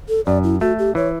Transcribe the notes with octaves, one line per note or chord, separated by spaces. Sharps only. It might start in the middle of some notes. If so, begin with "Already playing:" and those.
A4
F#2 D5
E4
A3 F#4
G4
E3 C#5